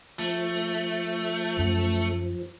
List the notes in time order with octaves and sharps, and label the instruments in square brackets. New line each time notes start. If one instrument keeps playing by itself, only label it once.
[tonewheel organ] F3 [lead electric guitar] A3
[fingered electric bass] F#2